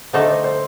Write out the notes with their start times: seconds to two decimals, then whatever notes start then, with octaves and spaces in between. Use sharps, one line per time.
0.13 D3 A3 D#4 A4 C5
0.29 C5
0.44 C5